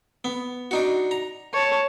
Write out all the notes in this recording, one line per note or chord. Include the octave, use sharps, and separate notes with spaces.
B3
D4 D#4 F#4
A#5
C#5 A5